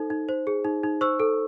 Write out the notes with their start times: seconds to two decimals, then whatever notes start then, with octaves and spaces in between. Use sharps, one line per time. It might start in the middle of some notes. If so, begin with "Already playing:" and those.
Already playing: D#4 A4 C5
0.10 D#4
0.29 C5
0.47 G#4
0.65 D#4
0.83 D#4
1.01 C5 C#6 E6
1.20 A4